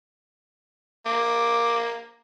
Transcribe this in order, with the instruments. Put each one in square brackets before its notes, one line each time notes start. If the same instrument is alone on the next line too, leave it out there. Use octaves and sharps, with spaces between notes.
[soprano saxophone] A#3 [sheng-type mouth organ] D6